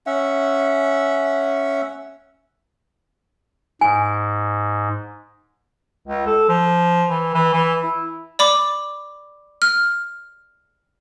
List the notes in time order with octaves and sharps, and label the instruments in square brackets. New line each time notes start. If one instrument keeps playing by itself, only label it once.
[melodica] C#4 E5 F#5
[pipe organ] G#2 [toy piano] G#5
[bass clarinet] C#2
A4
F3
E3
E3
E3
E4
[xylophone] D5 B5 D6
F6